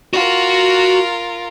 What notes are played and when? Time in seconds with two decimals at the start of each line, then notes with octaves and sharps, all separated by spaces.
0.13 F4 F#4 A#4 F#5